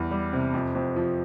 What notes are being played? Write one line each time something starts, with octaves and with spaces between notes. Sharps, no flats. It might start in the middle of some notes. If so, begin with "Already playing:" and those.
Already playing: E2 G3 E4
G3
C3
F2
F2
F3